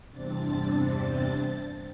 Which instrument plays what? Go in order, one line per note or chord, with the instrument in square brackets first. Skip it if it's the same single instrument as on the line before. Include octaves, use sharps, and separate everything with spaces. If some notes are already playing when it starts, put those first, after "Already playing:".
[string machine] E2 G2 C3 C4 D4 A6